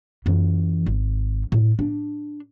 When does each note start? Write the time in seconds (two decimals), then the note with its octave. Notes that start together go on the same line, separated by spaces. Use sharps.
0.26 F#2 E3
0.86 G#1
1.52 A2
1.79 D4